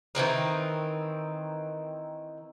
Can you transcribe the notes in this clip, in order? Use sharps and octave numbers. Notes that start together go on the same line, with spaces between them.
D#3 E3 C4 D#4